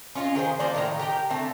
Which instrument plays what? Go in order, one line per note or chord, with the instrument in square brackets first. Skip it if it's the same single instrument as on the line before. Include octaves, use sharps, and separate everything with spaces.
[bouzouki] C#4 F4 C#5 D#5
D#3 G#4 A4 C5
F3 A#3 C5 D5
A2 D#3 F4 A#5
G4 A#4 G5
D3 A3 C4 A5